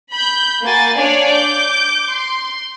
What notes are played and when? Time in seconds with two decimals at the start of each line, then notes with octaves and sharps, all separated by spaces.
0.12 B5 G6
0.64 A#3 F#4 G#5 A6
0.96 D4 C#5 D5 F5 G#5
1.31 D6 G6
2.15 C6